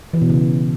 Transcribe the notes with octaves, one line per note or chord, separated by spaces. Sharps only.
E3
B2
C#3